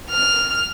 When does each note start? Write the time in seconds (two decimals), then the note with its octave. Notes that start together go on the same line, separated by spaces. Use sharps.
0.10 F6